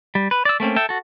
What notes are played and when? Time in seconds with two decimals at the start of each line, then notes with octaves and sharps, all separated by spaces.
0.15 G3
0.31 B4
0.45 D5 E6
0.60 A3 A#3 C4 C#4
0.76 A4 E5 G5
0.89 F#4 A4